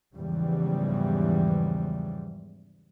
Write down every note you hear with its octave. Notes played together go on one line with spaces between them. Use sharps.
E2 G#2 C#3 E3 F3 G3